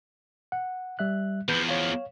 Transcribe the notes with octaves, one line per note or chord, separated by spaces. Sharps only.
F#5
G3 E5 F#6
E2 F3 B4 G6
C#5 F5